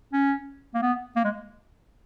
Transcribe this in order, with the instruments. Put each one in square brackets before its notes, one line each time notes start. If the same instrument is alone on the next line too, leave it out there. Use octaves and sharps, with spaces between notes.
[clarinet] C#4
A#3
B3
A#3
G#3